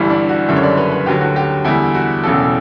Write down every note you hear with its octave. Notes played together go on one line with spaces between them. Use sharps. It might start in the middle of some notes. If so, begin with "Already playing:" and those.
Already playing: G1 G2 E3 G3 E4
D4
F#4
F#1 F#2 D3 G3 E5
C#5
D5
B4
B4
D2 D3 F#3 G4
F#4
G4
E2 D3 G3 E4
F#4
E1 E2 C#3 F#3 A4